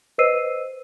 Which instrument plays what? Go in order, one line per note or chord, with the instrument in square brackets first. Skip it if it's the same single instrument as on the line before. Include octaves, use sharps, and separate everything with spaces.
[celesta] B4 C5 D#5 E6 C7 D#7